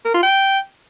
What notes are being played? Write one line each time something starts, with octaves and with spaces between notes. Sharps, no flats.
A#4
F4
G5